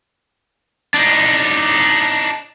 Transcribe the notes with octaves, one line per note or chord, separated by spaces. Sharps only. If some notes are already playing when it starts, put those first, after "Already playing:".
D4 D#4